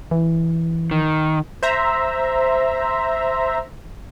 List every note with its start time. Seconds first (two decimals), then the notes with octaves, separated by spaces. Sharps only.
0.11 E3
0.91 D#3
1.63 C5 E5 A#5